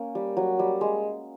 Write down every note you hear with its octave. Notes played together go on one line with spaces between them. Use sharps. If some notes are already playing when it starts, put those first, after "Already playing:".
Already playing: A#3 C#4
G3
F#3
G3
G#3